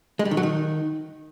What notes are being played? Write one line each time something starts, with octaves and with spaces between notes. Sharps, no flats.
G#3
G3
D#3
F#3
D#3